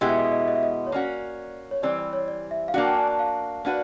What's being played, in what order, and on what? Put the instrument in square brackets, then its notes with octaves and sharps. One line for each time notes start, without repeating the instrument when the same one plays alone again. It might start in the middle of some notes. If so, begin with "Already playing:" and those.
[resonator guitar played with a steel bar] B2 G#3 B3 E4 G4 [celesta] D#5
[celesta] E5
D#5
E5
D#5
E5
D#5
E5
D#5
C#5
[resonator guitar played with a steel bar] A#3 C#4 F#4 [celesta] D5
[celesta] C#5
[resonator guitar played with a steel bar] E3 G3 C4 [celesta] D5
[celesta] D5
C#5
D5
E5
F5
[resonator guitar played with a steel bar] A#3 D4 F#4 [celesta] F#5
[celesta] G5
G#5
A5
F5
[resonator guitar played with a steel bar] A#3 D4 F#4 B4